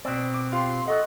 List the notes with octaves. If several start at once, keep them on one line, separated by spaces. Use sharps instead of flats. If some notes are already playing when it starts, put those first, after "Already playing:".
B2 C4 D5
D6
F4 G4 F5 C6
A4 D#5 F#5 C#6 F#6